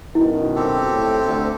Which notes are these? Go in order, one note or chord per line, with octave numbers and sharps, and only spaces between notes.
F#2 B2 D#3 E4
C4 G4 A4
A2
D2